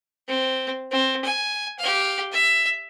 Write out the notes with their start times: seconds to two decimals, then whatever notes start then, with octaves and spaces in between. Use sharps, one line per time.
0.28 C4
0.91 C4
1.25 G#5
1.79 G4 F5
2.32 E5